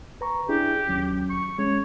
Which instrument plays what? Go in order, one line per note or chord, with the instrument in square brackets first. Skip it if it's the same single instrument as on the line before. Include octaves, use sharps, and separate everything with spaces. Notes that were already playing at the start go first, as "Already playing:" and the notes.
[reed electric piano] B4 A#5 C#6
[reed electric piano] D4 E4 G#4 [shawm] G4
[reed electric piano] D#2 F#3 C#4
[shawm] C#6
[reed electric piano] G#3 C#4 [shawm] C#5